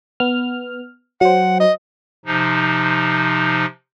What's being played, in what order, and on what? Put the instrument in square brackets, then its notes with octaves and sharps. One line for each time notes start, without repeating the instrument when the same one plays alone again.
[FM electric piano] B3 F6
[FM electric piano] F#3 C5 [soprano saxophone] F#5
[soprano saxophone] D#5
[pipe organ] C3 F3 D#4